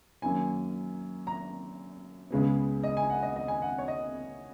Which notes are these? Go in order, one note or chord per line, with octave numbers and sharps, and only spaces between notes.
F#2 D#3 A#3 G#5
A#5
C#2 C#3 G#3 B3
D#5
G#5
F#5
D#5
D#5
G#5
F#5
C#5
D#5